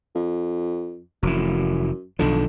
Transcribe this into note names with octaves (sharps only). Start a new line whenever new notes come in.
F2
F1 F#2 E3
B1 D3 D#3 F3